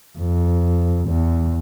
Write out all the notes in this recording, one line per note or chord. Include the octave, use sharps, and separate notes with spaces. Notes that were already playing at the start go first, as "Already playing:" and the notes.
F2
E2